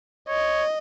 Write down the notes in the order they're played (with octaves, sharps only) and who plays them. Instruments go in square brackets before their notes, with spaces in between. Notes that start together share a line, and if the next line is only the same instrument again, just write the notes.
[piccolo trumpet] C#5 [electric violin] D#5